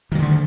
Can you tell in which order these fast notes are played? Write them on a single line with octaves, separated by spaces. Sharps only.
D#3 F#3 D3 A3